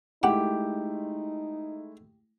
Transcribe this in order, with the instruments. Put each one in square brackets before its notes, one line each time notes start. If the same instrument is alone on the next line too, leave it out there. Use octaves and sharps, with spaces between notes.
[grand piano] G#3 A3 E4 [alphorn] D#4 [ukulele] G4 [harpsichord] F#5